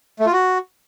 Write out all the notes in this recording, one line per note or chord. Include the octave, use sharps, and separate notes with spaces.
A3
F4
F#4